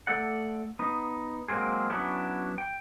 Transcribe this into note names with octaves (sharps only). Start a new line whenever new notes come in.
A3 A4 D5 F#5
B3 D#4
F#3 G#3 A#3 C4 G#4
F#3 B3 C#4 D4 E4
G5